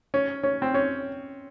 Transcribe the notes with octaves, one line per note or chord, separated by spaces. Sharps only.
C#4
C#4
C4
C#4